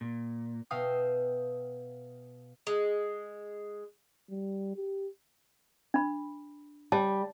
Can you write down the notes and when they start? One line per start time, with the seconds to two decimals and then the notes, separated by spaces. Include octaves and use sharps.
0.01 A#2
0.70 B2 E5 F5 G5 D#6 C7
2.67 G#3
4.30 G3
4.76 G4
5.94 D4 B5
6.92 G3 A5